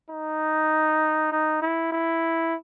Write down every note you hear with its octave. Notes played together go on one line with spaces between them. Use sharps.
D#4
D#4
E4
E4